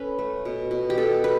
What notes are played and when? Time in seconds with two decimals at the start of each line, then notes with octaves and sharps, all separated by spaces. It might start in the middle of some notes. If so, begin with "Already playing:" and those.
Already playing: C#4 A4 B4
0.19 A3
0.45 B2
0.71 B2
0.90 G4
0.98 B3 A4
1.24 B4